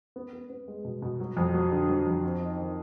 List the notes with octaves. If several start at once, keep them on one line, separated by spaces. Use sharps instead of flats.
B3
B3
B3
G#3
B2
B2
F#3
F2
F#3
D3
F#3
F2
C4
D#4
D#3